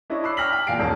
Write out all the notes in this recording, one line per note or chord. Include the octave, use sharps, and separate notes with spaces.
D4 E4 C#5 D#5 C#6
B5 C#6 D6 E6 F#6 C7
G5 F6 A#6 B6 F#7
G5
E2 A#2 F5 G#5 C7 D7
D#1 G#2 A#3 C#4 A5